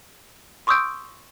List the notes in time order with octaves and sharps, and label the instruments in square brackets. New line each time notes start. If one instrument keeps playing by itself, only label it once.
[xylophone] C6 C#6 D#6 E6 G6 D7